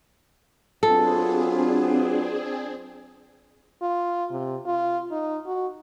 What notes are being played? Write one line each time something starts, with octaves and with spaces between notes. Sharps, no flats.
F#3 B3 C4 D4 F4 G#4 A4
F4
C3
F4
D#4
F#4